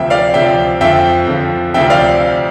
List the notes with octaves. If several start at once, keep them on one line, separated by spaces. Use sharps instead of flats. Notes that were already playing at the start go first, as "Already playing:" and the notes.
Already playing: D2 C3 F3 E5 G5
D5 F5
D2 C3 F3 E5 G5
F2 D3 F3 E5 G5
F2 D3 F3
D2 C3 F3 E5 G5
D5 F5